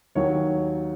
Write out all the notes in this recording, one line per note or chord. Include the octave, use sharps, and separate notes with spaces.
D#2 D#3 F#3 C#5